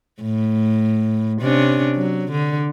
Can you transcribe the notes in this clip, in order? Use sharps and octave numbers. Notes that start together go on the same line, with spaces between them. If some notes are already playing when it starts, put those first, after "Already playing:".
A2
C3 C#4 D4
F#3
D3